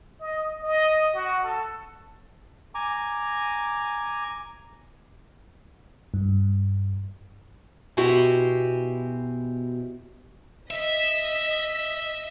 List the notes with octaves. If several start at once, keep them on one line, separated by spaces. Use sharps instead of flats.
D#5
D#5
F#4
A4
G#5 A#5 D6
G2
B2 E4 F#4 G4 C5 G#5
D#5 E5 B6